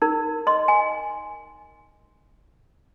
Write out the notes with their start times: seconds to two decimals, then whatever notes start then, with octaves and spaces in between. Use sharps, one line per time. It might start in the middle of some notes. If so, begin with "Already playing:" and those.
0.02 D#4 A#4
0.47 D#5 C6
0.68 G#5